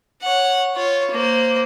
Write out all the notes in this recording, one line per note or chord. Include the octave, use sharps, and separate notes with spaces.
C#5 F#5
F4 C#5
A#3 C5